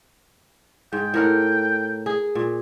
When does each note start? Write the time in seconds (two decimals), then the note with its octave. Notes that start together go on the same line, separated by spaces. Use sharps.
0.93 G#2 G5
1.14 A2 A#4 F#5
2.06 G#4
2.35 A#2